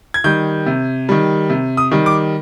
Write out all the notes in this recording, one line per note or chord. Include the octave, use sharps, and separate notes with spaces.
G#6
D#3 G3 G6
C3
D#3 G3
C3
D#6
D#3 G3
D6